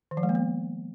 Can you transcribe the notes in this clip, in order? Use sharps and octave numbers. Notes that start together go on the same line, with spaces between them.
D#3
F3
G#3
A#3
B3